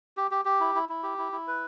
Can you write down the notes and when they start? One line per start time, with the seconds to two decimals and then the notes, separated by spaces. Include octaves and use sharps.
0.17 G4
0.31 G4
0.45 G4
0.60 E4
0.75 E4
0.89 E4
1.03 G4
1.18 E4
1.32 E4
1.48 B4